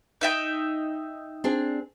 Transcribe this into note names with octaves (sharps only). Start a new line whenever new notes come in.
D#4 E5 G5
C4 D4 G#4